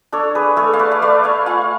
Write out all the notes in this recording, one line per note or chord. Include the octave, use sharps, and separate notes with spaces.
D4 A4 C#5
G#4 B4
A3 A4 C#5
F5
B4 D5
F5
A3 B4 D5
C#5 F5
F4 F5 G#5